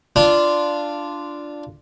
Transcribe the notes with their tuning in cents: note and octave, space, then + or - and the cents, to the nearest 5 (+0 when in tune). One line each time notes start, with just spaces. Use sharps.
D4 +0 F4 -15